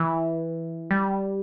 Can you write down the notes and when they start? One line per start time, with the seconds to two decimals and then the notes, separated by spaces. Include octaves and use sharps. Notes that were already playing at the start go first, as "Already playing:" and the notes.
Already playing: E3
0.91 G3